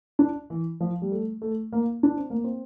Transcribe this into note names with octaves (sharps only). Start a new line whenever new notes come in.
D4
E3
F3
G3
A3
A3
A#3
D4
C4
A#3
C4